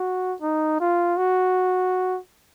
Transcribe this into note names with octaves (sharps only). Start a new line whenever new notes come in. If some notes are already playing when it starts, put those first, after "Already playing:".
Already playing: F#4
D#4
F4
F#4